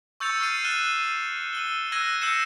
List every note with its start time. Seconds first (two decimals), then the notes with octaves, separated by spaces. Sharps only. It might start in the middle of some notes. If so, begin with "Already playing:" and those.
0.20 C#6 E6 G6 A6 C#7 F7
0.40 F6 A6 C7 D#7
0.65 F6 F#6 A6 D#7 E7
1.53 E6 D#7 G7
1.92 E6 F#6 G#6 A#6 D#7
2.22 E6 G6 A#6 C7 C#7 E7